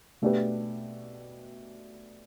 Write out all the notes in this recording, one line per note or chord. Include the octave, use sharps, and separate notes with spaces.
B2 A3 D4 G4 B4